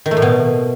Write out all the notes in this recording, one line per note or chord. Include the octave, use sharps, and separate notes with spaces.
D#3
A3
A2
B2